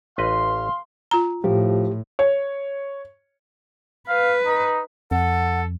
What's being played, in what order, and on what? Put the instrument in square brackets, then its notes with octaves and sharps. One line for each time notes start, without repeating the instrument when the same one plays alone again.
[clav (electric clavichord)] A1 B4 D#5 [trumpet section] F5 C6
[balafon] F4 A#5
[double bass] A2 [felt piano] F3 [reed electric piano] G4
[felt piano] C#5
[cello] B4 [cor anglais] F5
[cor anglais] D#4
[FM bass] F2 [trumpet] A4 [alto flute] F#5